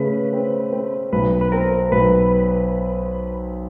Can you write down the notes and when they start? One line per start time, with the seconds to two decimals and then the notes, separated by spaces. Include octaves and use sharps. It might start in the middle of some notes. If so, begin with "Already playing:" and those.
Already playing: C#3 A3 B4
0.33 C4
0.73 C4
1.12 B1 B4
1.41 B4
1.52 C4 A#4
1.92 B1 B4